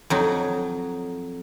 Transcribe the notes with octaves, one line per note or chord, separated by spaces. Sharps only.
F2 F#3 D#4